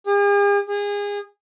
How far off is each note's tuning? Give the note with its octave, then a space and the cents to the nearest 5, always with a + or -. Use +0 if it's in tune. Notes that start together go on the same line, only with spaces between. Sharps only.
G#4 -45
G#4 -30